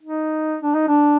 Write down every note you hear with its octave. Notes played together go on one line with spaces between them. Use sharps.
D#4
D4
D#4
D4